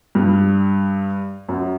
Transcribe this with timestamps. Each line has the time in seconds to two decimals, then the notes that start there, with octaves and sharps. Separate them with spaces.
0.15 G2
1.49 F#2